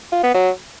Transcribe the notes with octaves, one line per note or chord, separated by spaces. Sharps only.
F4
B3
F#3